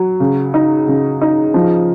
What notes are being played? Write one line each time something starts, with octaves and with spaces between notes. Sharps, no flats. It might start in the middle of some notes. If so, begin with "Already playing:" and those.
Already playing: F#3
C#3
D#4
C#3
D#4
F3